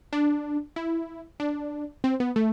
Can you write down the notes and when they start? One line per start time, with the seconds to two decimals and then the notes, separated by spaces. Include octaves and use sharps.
0.13 D4
0.76 E4
1.40 D4
2.04 C4
2.20 B3
2.36 A3